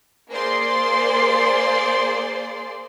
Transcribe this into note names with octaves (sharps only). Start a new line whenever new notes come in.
A#3 G#4 C5 D5 C6